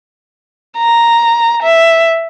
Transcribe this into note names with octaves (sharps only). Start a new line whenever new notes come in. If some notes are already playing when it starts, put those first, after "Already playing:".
A#5
E5